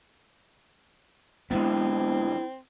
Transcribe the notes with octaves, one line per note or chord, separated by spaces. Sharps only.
G#2 D3 E3 G#3 A3 B3 C4 E4